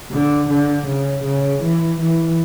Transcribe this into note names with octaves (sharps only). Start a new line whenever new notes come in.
D3
D3
C#3
C#3
E3
E3